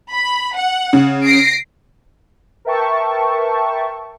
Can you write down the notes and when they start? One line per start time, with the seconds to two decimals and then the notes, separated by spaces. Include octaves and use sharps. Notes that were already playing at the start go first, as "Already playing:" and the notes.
0.11 B5
0.56 F#5
0.93 C#3
1.24 A#6 C7 D7
2.65 A#4 B4 E5 G5 A5 C#6